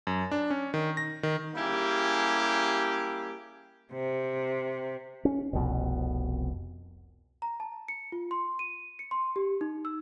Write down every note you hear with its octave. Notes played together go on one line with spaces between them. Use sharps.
F#2
D4
C#4
D#3
A#6
D#3
G3 A#3 C#4 E4 G4 G#4
C3
C#4
F1 C2 F2 B2
A#5
A5
C#7
F4
C6
D#7
C#7
C6
G4
D#4
E6